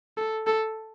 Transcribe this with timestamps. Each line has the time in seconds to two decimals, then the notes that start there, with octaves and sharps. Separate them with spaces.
0.17 A4
0.47 A4